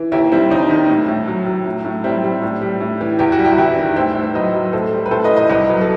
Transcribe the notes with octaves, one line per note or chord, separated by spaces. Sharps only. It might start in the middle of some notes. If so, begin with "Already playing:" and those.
Already playing: E3
D#2 E4 G4
G3 C4 E4
D#2 D#4
D#3
A2
A2
F#3
F#3
A2
A2
G3 C4 E4
G3
A2
G3
A2
E3
E2 G4
F#4
G3
E4 G4
E2 E4 G4
D#3
A2 C5 E5
A2
F#3 B4 D#5
F#3
A2 A4 C5
G3
B4
A2 A4 C5
B4 D#5
E3
B4 D#5
C2 B4 D#5
F#3
A4